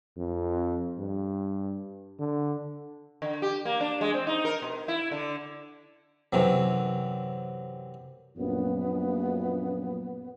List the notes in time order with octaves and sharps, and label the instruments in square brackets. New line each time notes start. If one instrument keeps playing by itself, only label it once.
[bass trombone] F2
G2
D3
[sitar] D3
G4
A#3
D4
G#3
C4
D#4
A#4
B2
E4
D3
[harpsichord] F#2 C3 E3 F#3
[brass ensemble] A#1 F#2 [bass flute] B3